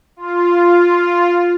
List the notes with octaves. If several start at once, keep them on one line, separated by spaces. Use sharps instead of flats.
F4